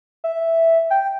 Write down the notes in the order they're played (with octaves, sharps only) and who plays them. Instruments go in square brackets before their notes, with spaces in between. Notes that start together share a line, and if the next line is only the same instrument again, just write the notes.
[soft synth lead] E5
G5